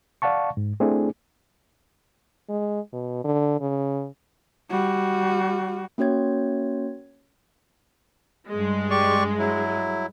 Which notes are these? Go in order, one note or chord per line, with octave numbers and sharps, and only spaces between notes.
D5 F5 F#5 A5 C#6
G#2
A3 C4 D4 E4 G#4
G#3
B2
D3
C#3
G3 F#4
A#3 C#4 F#4 C#5 G#6
G2 G#3
G4 D5 C#6
F#3 E4